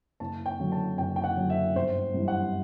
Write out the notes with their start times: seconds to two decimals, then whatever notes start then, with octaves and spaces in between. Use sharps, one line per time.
0.20 F#1 A5
0.46 G5
0.60 F#2 D3 F#3
0.72 A5
0.98 F#1 G5
1.16 G5
1.24 F#5
1.37 F#2 D3 F#3
1.50 E5
1.75 G1 C5
2.14 F#2 E3 G3
2.28 F#5